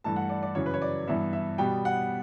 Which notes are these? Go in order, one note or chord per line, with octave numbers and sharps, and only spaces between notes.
G2 E3 A3 A5
F#5
D5
D5
F#2 C#3 E3 C#5
B4
C#5
D5
G2 E3 B3 E5
E5
B2 G3 B3 G5
F#5